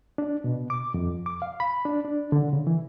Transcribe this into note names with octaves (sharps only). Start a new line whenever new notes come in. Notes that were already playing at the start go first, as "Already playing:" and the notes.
D4
B2
D6
F2
D6
F5
B5
D4
D4
D3
C#3
E3